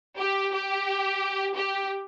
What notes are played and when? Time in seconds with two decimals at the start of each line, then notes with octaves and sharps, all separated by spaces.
0.18 G4
0.53 G4
1.55 G4